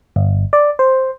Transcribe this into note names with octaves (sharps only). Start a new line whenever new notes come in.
G1
D5
C5